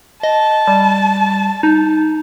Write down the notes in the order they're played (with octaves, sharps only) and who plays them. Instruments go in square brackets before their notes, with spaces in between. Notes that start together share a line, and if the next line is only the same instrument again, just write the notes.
[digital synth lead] D#5 [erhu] A5
[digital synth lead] G3
D#4